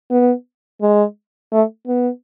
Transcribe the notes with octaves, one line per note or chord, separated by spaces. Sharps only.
B3
G#3
A3
B3